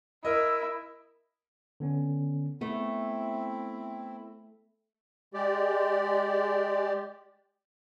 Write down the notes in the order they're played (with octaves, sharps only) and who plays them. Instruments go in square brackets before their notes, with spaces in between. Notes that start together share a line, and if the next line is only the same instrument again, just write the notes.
[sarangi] E4 [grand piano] A#4 D#5 [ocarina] E6
[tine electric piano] D3 B3 C#4
[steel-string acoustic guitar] A3 [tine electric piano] B3 [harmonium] C4 E4
[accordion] G#3 G4 D5